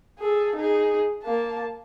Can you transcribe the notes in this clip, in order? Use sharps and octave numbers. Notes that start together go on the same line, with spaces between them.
G#4 A4
D#4 G#4
A#3 A5